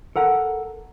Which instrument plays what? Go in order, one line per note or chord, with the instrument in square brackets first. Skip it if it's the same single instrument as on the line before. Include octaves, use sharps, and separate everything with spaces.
[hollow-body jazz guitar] A4 A#4 F#5